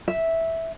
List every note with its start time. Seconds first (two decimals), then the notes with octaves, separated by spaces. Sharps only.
0.08 E5